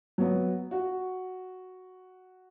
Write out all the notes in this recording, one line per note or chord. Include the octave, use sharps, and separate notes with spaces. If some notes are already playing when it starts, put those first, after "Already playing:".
F#3 B3
F#4